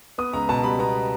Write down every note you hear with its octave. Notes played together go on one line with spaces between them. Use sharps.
B3 D#6
C#2 A#5
B2 A5
G3 B5
B3 A#5